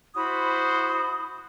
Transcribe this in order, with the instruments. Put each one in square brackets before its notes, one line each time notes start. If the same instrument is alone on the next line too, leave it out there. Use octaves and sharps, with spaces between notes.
[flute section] E4 B5 D#6 [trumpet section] F#4 C5